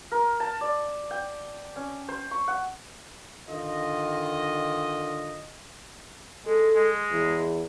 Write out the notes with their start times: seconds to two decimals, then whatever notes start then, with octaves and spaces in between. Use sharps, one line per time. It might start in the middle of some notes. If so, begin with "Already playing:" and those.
0.12 A#4
0.40 A5
0.61 D5
1.11 G5
1.76 C#4
2.09 C5
2.31 C#6
2.48 F#5
3.49 D3 D#3 F4 D#5
6.46 G#3 A4
6.75 G#3
7.11 E2